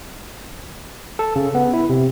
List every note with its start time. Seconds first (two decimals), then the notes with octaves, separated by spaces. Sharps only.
1.19 A4
1.36 C#3
1.55 B3
1.73 E4
1.89 C3